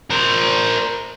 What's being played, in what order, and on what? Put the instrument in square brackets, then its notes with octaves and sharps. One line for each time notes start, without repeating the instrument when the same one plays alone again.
[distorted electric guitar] A#4 C5